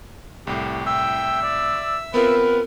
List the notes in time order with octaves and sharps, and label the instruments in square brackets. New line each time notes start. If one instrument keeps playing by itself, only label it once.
[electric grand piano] C2 A2 [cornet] G4
[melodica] E5 E6 [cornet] G5
[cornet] D5
[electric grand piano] B3 C4 F4 [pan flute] A#4 [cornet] B4